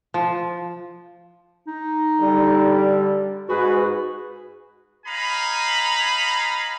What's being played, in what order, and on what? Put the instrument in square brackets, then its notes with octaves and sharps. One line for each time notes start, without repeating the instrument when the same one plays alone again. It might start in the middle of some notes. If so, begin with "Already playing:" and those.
[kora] F3
[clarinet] D#4
[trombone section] D3 G3
[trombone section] G#2 G#4 B4 [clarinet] F#4
[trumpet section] D#4 F5 G#5 A#5 B5